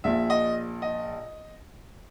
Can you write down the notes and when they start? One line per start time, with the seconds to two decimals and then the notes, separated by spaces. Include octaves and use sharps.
0.04 A#1 A#2 E5
0.30 D#5
0.82 D#5